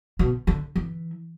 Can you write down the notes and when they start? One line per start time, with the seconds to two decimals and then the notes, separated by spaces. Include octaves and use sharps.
0.19 B2
0.47 D3
0.76 E3